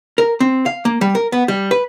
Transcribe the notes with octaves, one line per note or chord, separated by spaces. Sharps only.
A#4
C4
F5
A#3
G3
A#4
B3
G3
B4